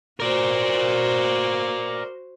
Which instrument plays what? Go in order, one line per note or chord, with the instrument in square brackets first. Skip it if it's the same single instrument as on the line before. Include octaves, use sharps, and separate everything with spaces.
[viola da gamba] F#4 C5 [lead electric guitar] A#4 D5